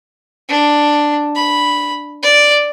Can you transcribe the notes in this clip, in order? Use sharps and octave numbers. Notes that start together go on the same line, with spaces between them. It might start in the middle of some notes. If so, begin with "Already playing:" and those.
D4
B5
D5